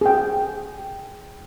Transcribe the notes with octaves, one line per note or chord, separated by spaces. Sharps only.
G#4 G5